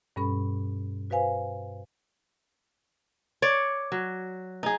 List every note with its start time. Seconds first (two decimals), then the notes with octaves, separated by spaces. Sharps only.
0.16 G2 B2 G3 C#4 A4 B5
1.10 F#4 B4 C5 F5 G#5
3.42 C#5 D5
3.92 F#3
4.63 D#4 G#4